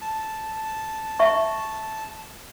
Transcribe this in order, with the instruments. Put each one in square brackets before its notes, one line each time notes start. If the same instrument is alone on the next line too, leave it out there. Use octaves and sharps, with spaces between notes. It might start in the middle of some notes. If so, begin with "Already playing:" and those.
[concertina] A5
[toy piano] E5 C#6